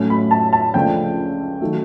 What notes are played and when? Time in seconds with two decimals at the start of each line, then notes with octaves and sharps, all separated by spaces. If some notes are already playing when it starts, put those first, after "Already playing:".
Already playing: A2 F#3 A3 C#4
0.10 B5
0.31 A5
0.53 A5
0.74 C#2 C#3 F3 A3 D4 G5
1.61 D#3 F#3 A3